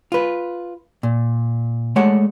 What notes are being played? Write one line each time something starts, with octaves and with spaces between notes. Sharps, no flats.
F4 B4
A#2
G#3 A3 C#5 D5 F#5